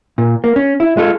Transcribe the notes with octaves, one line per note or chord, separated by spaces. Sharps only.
A#2
A#3
C#4
E4
G#3 F4 A4